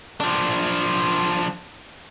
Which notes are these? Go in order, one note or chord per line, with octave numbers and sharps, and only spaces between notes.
F3 D4